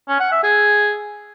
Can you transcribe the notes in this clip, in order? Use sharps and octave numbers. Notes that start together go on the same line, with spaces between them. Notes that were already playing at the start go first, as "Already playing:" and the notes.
C#4
F#5
E5
G#4